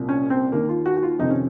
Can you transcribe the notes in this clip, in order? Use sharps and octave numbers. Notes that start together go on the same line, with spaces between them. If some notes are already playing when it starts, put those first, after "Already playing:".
Already playing: C2 A#2
C#4
C4
D#2 D#3 A#3
F4
F#4
F#4
F4
F2 C3 D#3 D#4
C#4